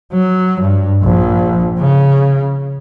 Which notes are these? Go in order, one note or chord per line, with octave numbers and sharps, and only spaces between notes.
F#3
G2
A#1
C#3